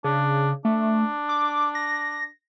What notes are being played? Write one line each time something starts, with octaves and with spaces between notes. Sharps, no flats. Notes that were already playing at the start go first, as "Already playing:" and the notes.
C#3 D4
A3 D4
D6
A#6